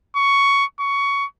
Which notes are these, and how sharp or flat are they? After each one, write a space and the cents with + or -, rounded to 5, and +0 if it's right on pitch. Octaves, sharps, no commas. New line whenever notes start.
C#6 +10
C#6 +15